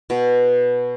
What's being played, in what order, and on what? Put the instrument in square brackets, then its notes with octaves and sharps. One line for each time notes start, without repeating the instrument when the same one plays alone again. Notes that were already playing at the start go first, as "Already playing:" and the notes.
[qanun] B2